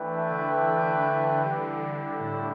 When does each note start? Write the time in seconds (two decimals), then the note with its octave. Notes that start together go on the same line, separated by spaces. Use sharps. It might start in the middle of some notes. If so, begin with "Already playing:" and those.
Already playing: E3 A3 D4 B4 E5 G5
0.29 D3
0.67 D3
1.43 G3 E4 G4 D5 G5
2.19 A2